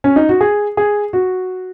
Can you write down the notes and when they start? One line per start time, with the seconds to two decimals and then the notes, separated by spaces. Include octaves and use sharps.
0.04 C#4
0.16 D#4
0.29 F#4
0.41 G#4
0.77 G#4
1.13 F#4